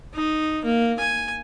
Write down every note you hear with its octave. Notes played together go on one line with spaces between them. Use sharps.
D#4
A#3
G#5